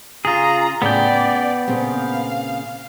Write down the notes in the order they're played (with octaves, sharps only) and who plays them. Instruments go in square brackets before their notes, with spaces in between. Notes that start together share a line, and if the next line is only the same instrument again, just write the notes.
[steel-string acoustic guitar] C#3 [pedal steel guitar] F4 G#4 [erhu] A#5
[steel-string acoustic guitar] A2 C#3 [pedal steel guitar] B3 G5 [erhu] D5
[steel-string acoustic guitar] C#4
[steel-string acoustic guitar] A#2 C#3 C4 [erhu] F5